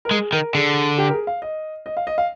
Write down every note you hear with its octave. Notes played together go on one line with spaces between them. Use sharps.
A#4
G#3 G#4
D#3 A#4
D3 G#4
G4
A#4
G#4
F5
D#5
D#5
F5
D#5
F5